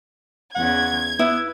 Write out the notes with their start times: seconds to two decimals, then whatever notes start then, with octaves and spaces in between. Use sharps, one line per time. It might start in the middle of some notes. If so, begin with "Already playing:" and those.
0.55 E2 C#3 F#5 G#6
1.19 B3 E4 B4